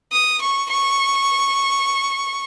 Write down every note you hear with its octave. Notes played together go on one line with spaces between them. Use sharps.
D#6
C#6
C#6